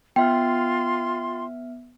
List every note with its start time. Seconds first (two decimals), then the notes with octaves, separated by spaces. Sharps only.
0.16 B3 F4 E5 G5 C6 F6